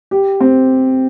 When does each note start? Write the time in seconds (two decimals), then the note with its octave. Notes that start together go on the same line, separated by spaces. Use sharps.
0.11 G4
0.41 C4